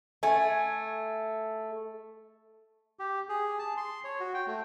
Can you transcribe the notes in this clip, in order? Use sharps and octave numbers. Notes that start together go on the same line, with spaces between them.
A3 G#5
G4
G#4
A5
C6
C#5
F#4
G5
A3